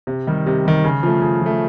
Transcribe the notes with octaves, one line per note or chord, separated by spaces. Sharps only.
C3
D#3 G3
C3
D#3 G3
C#3
F3 A3
C#3
F3 A3